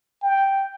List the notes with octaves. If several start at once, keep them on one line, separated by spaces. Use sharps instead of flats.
G5